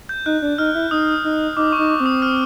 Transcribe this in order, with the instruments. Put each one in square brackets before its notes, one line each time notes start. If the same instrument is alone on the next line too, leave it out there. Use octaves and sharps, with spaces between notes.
[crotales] G6
[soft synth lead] D#4 [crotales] F#6
[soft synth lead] D4
[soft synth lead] D#4 [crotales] F6
[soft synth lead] E4
[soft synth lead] D#4 [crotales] D#6
[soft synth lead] D#4
[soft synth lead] D#4 [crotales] D6
[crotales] C#6
[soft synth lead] D#4
[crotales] D6
[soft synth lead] C4
[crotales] D#6
F6